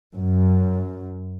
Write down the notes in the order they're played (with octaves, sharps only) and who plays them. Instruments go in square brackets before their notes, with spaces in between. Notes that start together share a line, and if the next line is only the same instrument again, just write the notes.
[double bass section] F#2